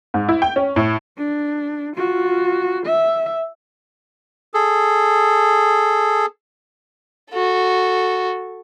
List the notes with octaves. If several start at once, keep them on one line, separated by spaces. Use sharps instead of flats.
G#2
E4
G5
C#4
A2
D4
F4 F#4
E5
G#4 A4
F#4 A4